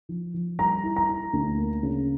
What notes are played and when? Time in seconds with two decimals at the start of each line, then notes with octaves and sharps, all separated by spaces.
0.09 F3
0.34 F3
0.59 G3 A#5
0.83 E4
0.96 A#5
1.08 E4
1.33 D2
1.58 A#3
1.83 C#3